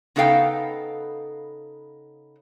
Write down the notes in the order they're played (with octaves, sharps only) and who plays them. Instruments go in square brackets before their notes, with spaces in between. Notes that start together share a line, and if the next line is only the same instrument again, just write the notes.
[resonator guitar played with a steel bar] C#3 B3 D#4 A4 F5 G5